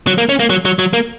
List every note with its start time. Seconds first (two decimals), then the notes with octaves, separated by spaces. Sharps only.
0.07 F#3
0.18 A#3
0.29 C#4
0.40 A#3
0.50 F#3
0.65 F#3
0.79 F#3
0.93 A#3